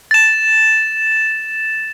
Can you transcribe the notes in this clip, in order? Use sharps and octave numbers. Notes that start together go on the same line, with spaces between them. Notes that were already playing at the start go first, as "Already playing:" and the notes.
A6 E7